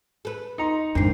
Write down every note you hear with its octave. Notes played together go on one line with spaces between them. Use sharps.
A4 B4
D#4 A#5 C6 C#7
F2 G#2 D#3 D4 C7